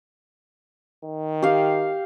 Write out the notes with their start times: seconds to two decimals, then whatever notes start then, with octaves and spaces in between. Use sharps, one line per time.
1.04 D#3
1.42 G4 F5